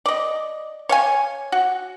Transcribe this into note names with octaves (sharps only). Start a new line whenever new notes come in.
D5 D#5
C#5 F5 G#5
F#4